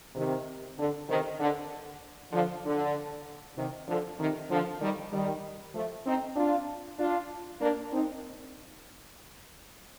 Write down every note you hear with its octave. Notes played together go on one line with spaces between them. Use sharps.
C3 D#3
D3
C3 D#3
D3
D3 F3
D3
C3 D#3
D3 F3
C3 D#3
D3 F3
D#3 G3
D#3 G3
F3 A3
C4 D#4
D4 F4
D4 F4
A#3 D4
C4 D#4